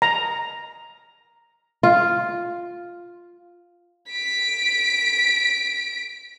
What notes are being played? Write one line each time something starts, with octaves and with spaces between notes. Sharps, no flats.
A#5
F4
B6 D7